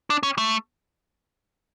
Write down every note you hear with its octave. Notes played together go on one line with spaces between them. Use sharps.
D4
C#4
A3